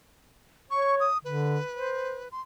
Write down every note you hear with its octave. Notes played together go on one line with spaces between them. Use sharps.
C#5 C#6
D#6
D3 B4
C5
C6